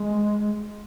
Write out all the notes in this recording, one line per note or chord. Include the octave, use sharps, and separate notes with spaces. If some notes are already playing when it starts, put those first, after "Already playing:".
Already playing: G#3